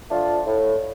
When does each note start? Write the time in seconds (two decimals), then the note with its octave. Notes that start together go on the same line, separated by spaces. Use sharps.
0.09 F3 A3 D4 F4
0.46 A2